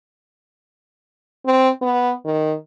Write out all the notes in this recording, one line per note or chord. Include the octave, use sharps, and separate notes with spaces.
C4
B3
D#3